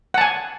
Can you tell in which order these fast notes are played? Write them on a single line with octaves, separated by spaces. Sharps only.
F#5 A5 G#5